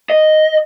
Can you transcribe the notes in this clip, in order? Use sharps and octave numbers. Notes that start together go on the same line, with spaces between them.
D#5